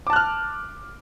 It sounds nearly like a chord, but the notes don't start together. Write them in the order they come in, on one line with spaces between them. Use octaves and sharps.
D6 A5 F#6 F6